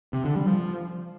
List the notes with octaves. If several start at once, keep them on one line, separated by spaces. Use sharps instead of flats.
C3
D3
G3
F3